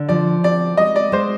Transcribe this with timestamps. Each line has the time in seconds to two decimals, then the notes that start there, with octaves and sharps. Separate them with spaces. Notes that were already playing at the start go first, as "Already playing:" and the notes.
Already playing: D3
0.09 F3 D5
0.44 C4 D5
0.77 G#3 D#5
0.96 D5
1.12 G#3 C5